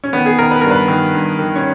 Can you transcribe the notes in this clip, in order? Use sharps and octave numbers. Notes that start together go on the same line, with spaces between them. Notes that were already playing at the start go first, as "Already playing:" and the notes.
C#4
D#3 B3
G#4
D#3 A#4
B4
G2 A#4
B4
D#3
G2
D#3
C#4